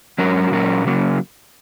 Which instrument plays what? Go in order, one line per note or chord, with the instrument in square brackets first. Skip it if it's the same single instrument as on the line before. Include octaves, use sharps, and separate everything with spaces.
[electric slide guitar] G#2 F#3 C#4 F#4 A#4
A#2 F#3 C#4 A#4
C#3 F#3 A#3